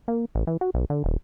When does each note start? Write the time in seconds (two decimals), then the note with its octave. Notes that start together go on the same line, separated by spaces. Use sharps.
0.08 A#3
0.35 A1
0.47 E3
0.61 F#4
0.74 B1
0.90 D3
1.04 D#1